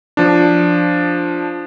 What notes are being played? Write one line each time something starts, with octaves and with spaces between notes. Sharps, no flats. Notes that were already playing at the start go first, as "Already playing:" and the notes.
F3 D4